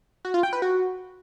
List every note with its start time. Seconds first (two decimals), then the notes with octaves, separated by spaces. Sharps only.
0.25 F#4
0.34 F4
0.43 G5
0.53 B4
0.62 F#4